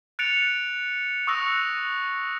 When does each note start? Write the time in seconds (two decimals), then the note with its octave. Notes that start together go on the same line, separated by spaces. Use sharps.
0.19 F#6 A6 C#7 D7 F7
1.27 C#6 D#6 E6 F#6 A#6 C#7